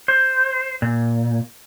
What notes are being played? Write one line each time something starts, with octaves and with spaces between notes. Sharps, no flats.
C5
A#2